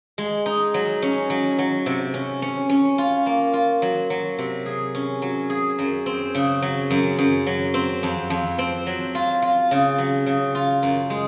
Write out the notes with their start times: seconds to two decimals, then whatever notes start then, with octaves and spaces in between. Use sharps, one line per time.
0.18 G#3
0.46 D#4
0.74 F#3
1.02 C#4
1.30 F#3
1.59 F#3
1.86 C3
2.14 C#4
2.42 C#4
2.69 C#4
2.98 F4
3.26 A#3
3.53 F4
3.82 F#3
4.10 F#3
4.38 C3
4.66 G#4
4.95 C#4
5.22 F#3
5.50 G#4
5.79 F#2
6.06 C4
6.35 C#3
6.62 F#3
6.90 F#2
7.18 F#2
7.46 F#3
7.74 C4
8.03 F2
8.30 F2
8.59 C4
8.86 F#3
9.15 F4
9.42 F4
9.71 C#3
9.98 F#3
10.26 C#3
10.55 F4
10.83 F#2
11.10 G#3